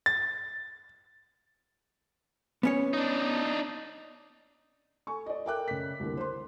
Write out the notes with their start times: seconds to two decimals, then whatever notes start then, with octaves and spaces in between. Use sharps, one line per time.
0.06 A6
2.63 B3 C#4 C#5
2.93 D4 D#4
5.07 A4 G#5 C#6
5.26 D5 D#5
5.45 A4 A#4 E5 G5 D6 F#6
5.68 C#3 B6
6.00 C2 D3 E3 A#3
6.17 C5 C6